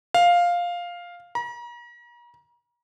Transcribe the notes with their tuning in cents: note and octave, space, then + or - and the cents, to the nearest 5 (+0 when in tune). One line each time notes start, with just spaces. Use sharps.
F5 +5
A#5 +40